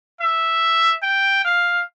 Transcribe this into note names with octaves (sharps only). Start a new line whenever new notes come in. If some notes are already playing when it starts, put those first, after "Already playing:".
E5
G5
F5